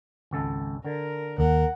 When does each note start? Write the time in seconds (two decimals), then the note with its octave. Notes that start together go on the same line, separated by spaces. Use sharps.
0.31 G#1 C#2 A4
0.85 D3 A#4
1.38 D#2 A#4 F#5